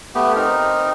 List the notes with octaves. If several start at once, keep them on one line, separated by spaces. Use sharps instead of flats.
A3 B3 G4
C4 D#4 A#4